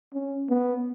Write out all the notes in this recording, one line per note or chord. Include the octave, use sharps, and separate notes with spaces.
C#4
B3